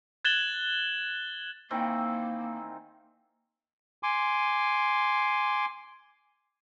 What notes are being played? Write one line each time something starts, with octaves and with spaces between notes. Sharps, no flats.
F#6 G#6 A6 E7 F#7 G7
D#3 E3 A#3 C4
G#5 C6 D6